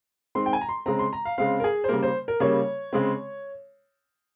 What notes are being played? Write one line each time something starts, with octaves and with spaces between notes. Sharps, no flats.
D#3 G#3 C4 C6
G5
G#5
A#5
C6
C#3 G#3 C4 A#5
C6
A#5
F5
C#3 G#3 C4 F5
A#4
G#4
C5
C#3 G3 A#3 A#4
C5
A#4
C#3 G3 A#3 C#5
C#3 G#3 C4